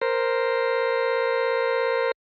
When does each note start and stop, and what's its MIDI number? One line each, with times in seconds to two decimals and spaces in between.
0.01 2.11 70
0.01 2.11 72